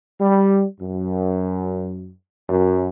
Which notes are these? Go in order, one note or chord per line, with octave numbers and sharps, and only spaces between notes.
G3
F#2
F#2